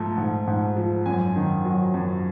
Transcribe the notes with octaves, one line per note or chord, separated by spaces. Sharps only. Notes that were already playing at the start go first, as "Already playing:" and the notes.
Already playing: G#2 F3 A3
G#2
G#2
F3
F#2 G#5
D#3
F#3
F#2